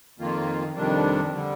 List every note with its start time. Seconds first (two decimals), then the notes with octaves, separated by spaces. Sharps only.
0.19 F2 D#3 A#3 F4
0.75 F2 C3 D#3 G3 D4
1.32 D3 G3